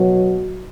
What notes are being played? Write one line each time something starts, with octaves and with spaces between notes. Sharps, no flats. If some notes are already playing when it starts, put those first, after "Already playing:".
Already playing: B2 F#3